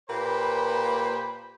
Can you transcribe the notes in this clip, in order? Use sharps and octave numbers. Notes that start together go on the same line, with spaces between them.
A#2 A#3 G4 B4 C5 B5